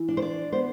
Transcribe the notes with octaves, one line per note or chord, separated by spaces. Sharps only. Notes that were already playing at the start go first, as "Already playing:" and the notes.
Already playing: E3
D4
C5
D5
B3 C5